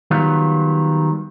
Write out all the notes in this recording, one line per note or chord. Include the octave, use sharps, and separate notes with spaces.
D#3 F#3 G3 B3 F4